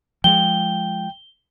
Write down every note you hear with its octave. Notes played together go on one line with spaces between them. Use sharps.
F3 G#3 G5 G7